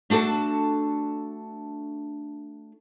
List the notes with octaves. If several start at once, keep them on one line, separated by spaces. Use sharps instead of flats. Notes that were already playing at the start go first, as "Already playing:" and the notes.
A3 D4 F#4 A4 A5